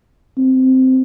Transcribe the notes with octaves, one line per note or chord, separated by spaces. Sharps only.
C4